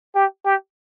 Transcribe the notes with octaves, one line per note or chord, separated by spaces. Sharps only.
G4
G4